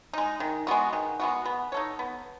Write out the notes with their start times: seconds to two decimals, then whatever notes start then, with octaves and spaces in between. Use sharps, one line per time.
0.13 G#3 D#4
0.40 D#3
0.67 G#3 B3 F#4
0.93 D#3
1.20 G#3 B3 F#4
1.45 B3
1.72 D#4 A4 C#5
1.99 B3